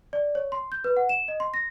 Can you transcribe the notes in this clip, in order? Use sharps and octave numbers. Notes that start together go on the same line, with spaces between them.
D5
C#5
C6
G6
B4
F#5
E7
D#5
C6
A#6